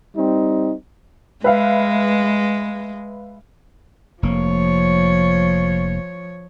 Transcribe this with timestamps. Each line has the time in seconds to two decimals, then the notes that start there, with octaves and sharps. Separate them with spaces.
0.16 G3 C4 D#4
1.44 G#3 B4 E5 F5
4.23 F1 F3 A#3 C#5